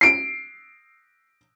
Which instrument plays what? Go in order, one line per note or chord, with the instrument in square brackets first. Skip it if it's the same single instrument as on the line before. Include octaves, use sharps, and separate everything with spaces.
[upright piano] C7 D7